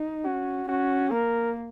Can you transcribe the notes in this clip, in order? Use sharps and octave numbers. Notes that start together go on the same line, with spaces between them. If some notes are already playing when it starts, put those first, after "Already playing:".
Already playing: D#4
C#4 F#4
C#4 F#4
A#3 A#4